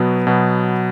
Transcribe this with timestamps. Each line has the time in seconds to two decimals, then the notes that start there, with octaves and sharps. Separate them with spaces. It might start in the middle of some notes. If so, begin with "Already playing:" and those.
Already playing: B2 F#3 B3
0.27 B2 F#3 B3